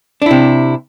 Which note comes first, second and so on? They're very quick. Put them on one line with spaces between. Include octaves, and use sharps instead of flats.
D4 E4 C3